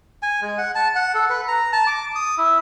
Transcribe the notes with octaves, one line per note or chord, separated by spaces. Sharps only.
G#5
G#3
F#5
A5
F#5
A4
B4
A#5
A5
D6
D#6
E4